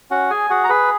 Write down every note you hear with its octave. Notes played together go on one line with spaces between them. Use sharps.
C#4 F#4 F#5
G#4 G#5
F#4 G#4 F#5
A#5
G#4 B4 B5